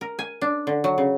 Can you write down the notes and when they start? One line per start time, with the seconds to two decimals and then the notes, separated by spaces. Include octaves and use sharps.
0.01 A#4
0.19 G#5
0.42 D4
0.67 D3
0.84 F#3
0.98 C#3